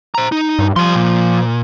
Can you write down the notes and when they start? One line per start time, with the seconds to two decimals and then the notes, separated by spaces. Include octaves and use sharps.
0.15 C5 A#5
0.32 D#4
0.59 G2
0.76 F3 G3 C6
0.95 A#2